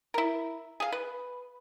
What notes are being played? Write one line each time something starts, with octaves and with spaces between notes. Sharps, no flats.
E4 A#4
G#4 F5
B4